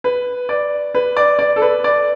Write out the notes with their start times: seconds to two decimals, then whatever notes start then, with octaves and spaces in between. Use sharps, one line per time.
0.04 B4
0.49 D5
0.94 B4
1.17 D5
1.39 D5
1.56 A4
1.62 B4
1.84 D5